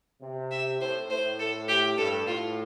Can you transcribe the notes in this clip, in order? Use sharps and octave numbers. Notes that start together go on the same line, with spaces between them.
C3
E5
A2 C5
A2 C5
A4
G4
G2 A4
A2 F4